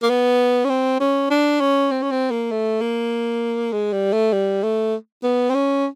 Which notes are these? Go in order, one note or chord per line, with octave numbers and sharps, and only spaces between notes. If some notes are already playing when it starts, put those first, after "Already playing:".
A#3
B3
C#4
C4
C#4
D4
C#4
C4
C#4
C4
A#3
A3
A#3
G#3
G3
A3
G3
A3
B3
C4
C#4